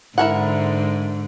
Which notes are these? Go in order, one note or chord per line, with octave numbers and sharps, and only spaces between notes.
G#2 D3 E4 A#4 F#5